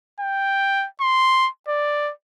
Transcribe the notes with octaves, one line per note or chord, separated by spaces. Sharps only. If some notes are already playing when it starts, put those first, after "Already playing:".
G5
C6
D5